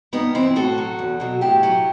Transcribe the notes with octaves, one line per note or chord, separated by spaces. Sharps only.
G2 B3 D#4
E3 C4 E4
A2 F#4 A4
F#3
E2
B2 F#3
A2 E4 G4
F#3